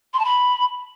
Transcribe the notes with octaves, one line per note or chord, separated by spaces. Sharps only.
C6
A5
B5